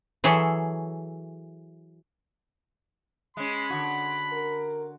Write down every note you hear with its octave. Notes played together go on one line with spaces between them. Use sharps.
E3 F#3 G#4 A4 C#5 E5
G#3 C#4 B5
D3 F#4
A#4